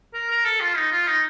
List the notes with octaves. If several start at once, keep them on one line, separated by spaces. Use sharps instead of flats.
A#4
A#4
A4
F4
D#4
F4
D#4